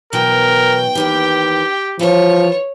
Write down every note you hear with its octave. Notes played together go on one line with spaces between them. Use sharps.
B2 E3 F#3 A#4 G5
D#2 D#3 E3 G4
E3 F3 F4 C#5